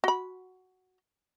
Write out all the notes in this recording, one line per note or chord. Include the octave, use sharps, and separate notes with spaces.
F#4 B5